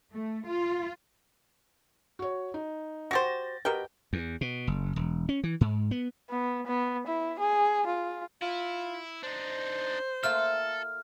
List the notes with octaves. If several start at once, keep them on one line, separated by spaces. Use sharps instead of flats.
A3
F4
F#4 C#5
D#4
F#4 G4 C5 A6 A#6
B2 G4 A#4 B4 G5
E2
B2
F#1
E1
C#4
E3
G#2
B3
B3
B3
E4
G#4
F4
E4 F4
D4 D#4 C5
A3 A#3 F4 A4 F6